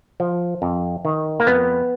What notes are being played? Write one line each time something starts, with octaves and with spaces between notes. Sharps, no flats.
F3
F2
D#3
A#3
F2 B3